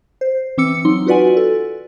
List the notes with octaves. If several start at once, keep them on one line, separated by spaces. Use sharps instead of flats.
C5
E3 C4 D6 E6 C#7
F#3 D#4 C6
F4 F#4 B4 D5 F#5 G#5
A4